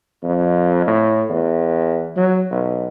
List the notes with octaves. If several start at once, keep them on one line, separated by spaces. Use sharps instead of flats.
F2
A2
E2
F#3
B1